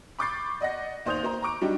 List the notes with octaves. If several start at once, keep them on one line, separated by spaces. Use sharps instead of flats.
B5 C#6 D6 G6 A6 C7
D5 D#5 F#5 A#6
D#2 C5 D5 D#6 G6 F7
A#3 C5 A#5
A#5 C#6 D6 D7
F#3 G3 D4 D#4 F#4 G4